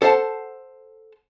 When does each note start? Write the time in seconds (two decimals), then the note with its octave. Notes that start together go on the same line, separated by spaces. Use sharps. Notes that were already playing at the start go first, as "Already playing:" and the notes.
0.02 A4 C5 F5 F#5 A5